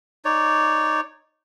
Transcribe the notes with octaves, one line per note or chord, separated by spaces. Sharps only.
D#4 C#5 D5